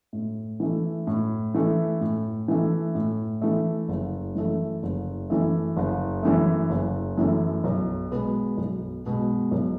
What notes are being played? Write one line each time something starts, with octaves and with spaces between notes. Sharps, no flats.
A2
E3 A3
A2
E3 A3
A2
E3 A3
A2
E3 A3
F#1
F#2 E3 A3
F#1
F#2 E3 A3
F#1
F#2 E3 A3
F#1
F#2 E3 A3
B1
B2 G#3 B3
B1
B2 G#3 B3
B1